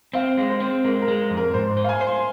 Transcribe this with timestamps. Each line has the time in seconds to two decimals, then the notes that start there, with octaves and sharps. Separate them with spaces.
0.13 C4 F5
0.37 G#3
0.50 C5
0.60 C4
0.84 G#3 A#4
1.01 A#4
1.08 G#3
1.30 F2
1.37 A#4
1.54 G#2 C5
1.77 C5
1.84 F5
1.89 G#5
2.01 C5
2.07 C6